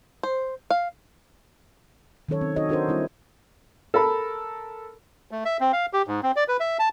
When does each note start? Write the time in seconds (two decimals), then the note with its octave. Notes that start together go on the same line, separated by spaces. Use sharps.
0.23 C5
0.70 F5
2.29 D#3 F#3 C#4 A4 C#5
2.41 C4
2.56 D#4 F#4 A4 C#5 D#5
2.69 D4 F#4 A4 A#4 C5
2.88 G3 C4 E4
3.94 A4 A#4 B5
5.31 A3
5.45 E5
5.60 C4
5.73 F5
5.93 G4
6.07 G#2
6.23 C4
6.36 D5
6.48 B4
6.60 E5
6.79 A5